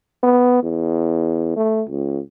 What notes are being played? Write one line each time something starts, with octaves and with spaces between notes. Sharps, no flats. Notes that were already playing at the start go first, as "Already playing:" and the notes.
B3
E2
A3
C#2